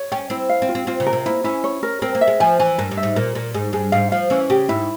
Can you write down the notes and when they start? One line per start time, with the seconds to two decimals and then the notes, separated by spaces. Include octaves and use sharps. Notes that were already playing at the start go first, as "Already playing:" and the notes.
Already playing: C#5
0.12 C#4 G5
0.30 C4 E4
0.49 F5
0.62 C4
0.69 F4
0.75 C4
0.87 C4 F4
1.00 C#3
1.06 A#4
1.13 C3
1.26 A#3 E4
1.44 C#4 E4
1.64 C#5
1.83 A#4
2.02 C4 A#4
2.15 A#3
2.21 E5
2.28 G#3
2.40 F3 G#5
2.59 E3 G#5
2.78 G2 A#4
2.91 G2
2.97 E5
3.03 G#2
3.16 A#2 A#4
3.35 A#2 A#4
3.54 G#2 G#4
3.73 G2 G#4
3.92 G#2 F5
4.12 F3 F5
4.30 E3 C#4
4.50 C#3 G4
4.69 G#2 E4